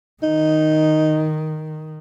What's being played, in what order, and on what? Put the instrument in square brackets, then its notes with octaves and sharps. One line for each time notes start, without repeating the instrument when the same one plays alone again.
[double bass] D#3 [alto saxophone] D#4